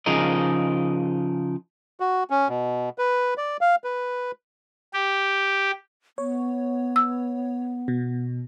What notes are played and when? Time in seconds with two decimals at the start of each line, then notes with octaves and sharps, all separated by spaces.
0.06 C#3 F3 D#4 G#4 A#4 D#5
2.00 F#4
2.30 C#4
2.49 B2
2.98 B4
3.38 D5
3.61 F5
3.84 B4
4.94 G4
6.18 B3 C#5
6.96 E6
7.88 B2